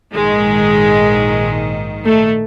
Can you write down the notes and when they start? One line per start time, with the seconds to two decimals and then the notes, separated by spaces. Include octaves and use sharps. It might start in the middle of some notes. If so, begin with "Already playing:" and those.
0.13 A#1 G#2 D#3 G#3
2.05 A3